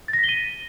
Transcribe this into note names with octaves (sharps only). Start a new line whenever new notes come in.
A6
A#6
B6
G7
D#7